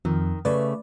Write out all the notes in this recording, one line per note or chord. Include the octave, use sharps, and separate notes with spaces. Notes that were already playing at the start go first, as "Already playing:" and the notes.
F2 D#3
C#3 A3 B4 D5